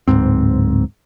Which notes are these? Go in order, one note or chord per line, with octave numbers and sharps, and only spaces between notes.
D1 G#1 G#2 C4